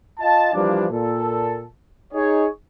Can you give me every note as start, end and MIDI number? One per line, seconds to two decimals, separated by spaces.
0.20 0.52 65
0.20 0.52 75
0.20 0.52 77
0.20 0.52 81
0.53 0.85 52
0.53 0.85 53
0.53 0.85 55
0.53 0.85 58
0.53 0.85 62
0.90 1.64 46
0.90 1.64 69
2.13 2.46 63
2.13 2.46 68
2.13 2.46 73